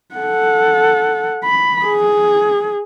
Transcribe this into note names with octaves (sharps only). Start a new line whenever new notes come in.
A4 F#5
B5
G#4